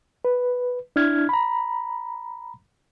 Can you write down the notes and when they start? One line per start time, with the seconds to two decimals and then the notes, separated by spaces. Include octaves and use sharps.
0.25 B4
0.96 D4 E4 F6 G#6
1.29 A#5 B5